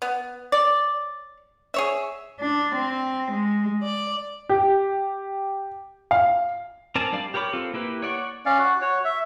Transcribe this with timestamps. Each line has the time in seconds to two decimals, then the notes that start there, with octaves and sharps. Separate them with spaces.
0.02 B3
0.52 C#5 D5
1.74 G#4 C#5 E5
2.40 D4
2.76 C4
3.32 G#3
3.82 D5
4.49 G4
6.11 F5
6.95 C4 A#4 D5 G#5 A5
7.12 G3 D4 D5 F5 D6
7.34 G4 A#4 C#5 B5 D6
7.53 C4 F4 A4
7.74 A#3 E4 G4 B4
8.02 C#5 D5 F#5 C#6
8.46 C#4 D5 F5
8.59 F#4
8.81 F#4 C#5
9.05 E5